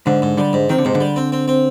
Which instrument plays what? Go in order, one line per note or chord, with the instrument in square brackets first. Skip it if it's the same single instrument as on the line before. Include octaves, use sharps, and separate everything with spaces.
[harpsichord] G#2 [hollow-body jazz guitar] D3
[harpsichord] G#2
[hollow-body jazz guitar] D3 [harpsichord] G3
[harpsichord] G#2
[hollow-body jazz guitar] D#3 [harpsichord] C4
[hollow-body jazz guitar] D3
[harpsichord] G#2 [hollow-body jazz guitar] C3
[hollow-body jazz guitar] D3
[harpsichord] G3
C4
C4
C4